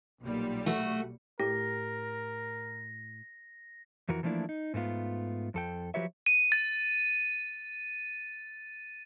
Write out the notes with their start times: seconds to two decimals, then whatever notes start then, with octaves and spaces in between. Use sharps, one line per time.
0.22 B1 A#2 G3
0.66 A3 F#4
1.40 A2 G4 A#4 A#6
4.09 F2 E3 F#4 A#4
4.23 E3 F3 A3 A#3 D4 E4
4.49 D#4
4.74 G#2 A3 B3 F4
5.54 F2 A4 G5
5.94 F3 F#3 G4 B4 C#5 E5
6.26 D#7
6.52 A6